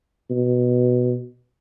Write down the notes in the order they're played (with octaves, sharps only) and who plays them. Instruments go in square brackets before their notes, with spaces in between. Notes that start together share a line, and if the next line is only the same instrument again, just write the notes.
[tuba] B2